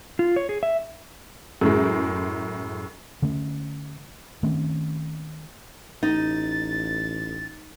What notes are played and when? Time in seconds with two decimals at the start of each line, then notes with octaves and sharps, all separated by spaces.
0.19 F4
0.36 C#5
0.49 G#4
0.63 E5
1.61 F#2 A2 G#3
3.22 D3 A3 C#4
4.43 D#3 A3 C4 C#4
6.03 A1 D#4 A6